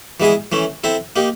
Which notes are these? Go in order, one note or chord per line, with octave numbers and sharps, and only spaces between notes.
E3 G#3 B3 E4 G#4
E3 A3 C#4
C4 E4 A4
A#3 D#4 G4